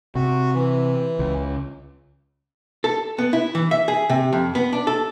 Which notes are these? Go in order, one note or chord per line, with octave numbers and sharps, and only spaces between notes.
C3 F#4
E3
C#2
A4
B3
E4
E3
E5
G#4
C3
F2
B3
D4
A4